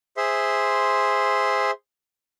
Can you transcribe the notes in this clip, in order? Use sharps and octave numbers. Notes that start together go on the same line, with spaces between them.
G#4 C5 E5 C6